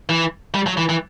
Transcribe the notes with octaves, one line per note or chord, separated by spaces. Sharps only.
E3
G3
F#3
E3
E3